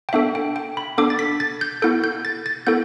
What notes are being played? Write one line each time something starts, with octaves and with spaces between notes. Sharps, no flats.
G5
B3 D4 A4 E5
G5
G5
B5
B3 D4 A4 D6
A6
B6
A6
G6
B3 E4 A4 G6
G6
A6
A6
B3 E4 A4 G6